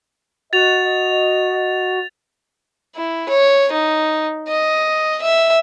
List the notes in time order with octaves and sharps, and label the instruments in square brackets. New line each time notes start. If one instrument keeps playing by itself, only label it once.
[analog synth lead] F#4 [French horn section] D#5 [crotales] A6 F7
[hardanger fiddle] E4
C#5
D#4
D#5
E5